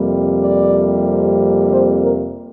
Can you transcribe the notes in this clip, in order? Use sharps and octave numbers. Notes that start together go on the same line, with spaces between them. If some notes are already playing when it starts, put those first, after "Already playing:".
Already playing: F2 C3 G3 A#3
D5
C5
A#4